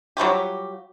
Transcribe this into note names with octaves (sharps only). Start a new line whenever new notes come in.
F#3 G3 F4 G4